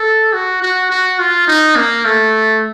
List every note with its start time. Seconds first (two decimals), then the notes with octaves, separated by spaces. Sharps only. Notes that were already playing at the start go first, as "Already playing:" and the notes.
Already playing: A4
0.33 F#4
0.62 F#4
0.91 F#4
1.19 F4
1.48 D#4
1.77 A#3
2.05 A3